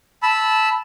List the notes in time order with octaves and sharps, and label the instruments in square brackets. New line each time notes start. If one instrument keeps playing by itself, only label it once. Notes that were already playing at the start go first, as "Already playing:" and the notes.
[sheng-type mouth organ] A5 B5 E6